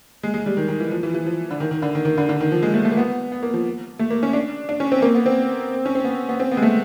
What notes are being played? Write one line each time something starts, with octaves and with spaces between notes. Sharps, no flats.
G#3
G#3
G3
D#3
D#3
E3
F3
E3
E3
F3
D3
D#3
D#3
D3
D#3
D#3
D3
D3
D#3
F3
G#3
A3
A3
A#3
B3
B3
A#3
F3
A3
A#3
C#4
D4
D4
C#4
C4
A#3
B3
C4
C#4
C4
B3
B3
C4
B3
G#3
A3